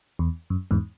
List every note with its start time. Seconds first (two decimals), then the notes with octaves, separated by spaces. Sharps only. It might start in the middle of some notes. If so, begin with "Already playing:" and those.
0.19 E2
0.50 F#2
0.71 E2 G#2